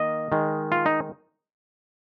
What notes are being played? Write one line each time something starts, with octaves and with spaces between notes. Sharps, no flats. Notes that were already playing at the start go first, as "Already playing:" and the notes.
Already playing: D#3 A#3 D#5
D#3 G#3
F4
D#4